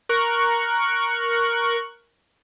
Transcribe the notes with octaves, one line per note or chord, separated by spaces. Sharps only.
A#4 C#6 F#6